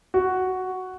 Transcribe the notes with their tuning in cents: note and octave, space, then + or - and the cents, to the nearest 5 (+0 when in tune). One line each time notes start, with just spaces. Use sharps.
F#4 +5